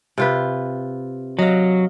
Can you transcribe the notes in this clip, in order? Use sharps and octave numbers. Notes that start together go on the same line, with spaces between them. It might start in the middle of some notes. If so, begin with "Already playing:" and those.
C3 F4 B4
F#3 D#5 F5